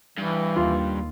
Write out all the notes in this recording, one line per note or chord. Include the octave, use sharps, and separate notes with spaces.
G2 E3
D#2 F4